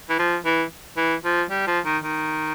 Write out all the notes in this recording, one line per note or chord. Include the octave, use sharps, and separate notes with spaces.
E3
F3
E3
E3
F3
G3
F3
D#3
D#3